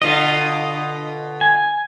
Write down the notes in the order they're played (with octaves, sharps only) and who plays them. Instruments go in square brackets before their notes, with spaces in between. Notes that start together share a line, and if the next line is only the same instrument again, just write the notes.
[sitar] B2 D3 F4 [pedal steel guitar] D#5
[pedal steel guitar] G#5